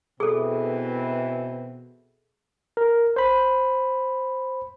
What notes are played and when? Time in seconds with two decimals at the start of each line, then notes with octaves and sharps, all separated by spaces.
0.20 B2 E3 C4 E4 G#4 A4
2.77 A#4
3.16 C5 B5